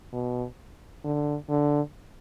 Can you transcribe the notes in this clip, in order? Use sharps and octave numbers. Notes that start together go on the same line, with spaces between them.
B2
D3
D3